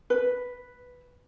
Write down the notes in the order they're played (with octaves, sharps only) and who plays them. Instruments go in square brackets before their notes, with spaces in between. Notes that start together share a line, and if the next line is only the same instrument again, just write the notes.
[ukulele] B4